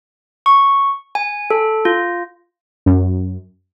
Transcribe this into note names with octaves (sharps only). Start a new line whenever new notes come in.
C#6
G#5
A4
F4
F#2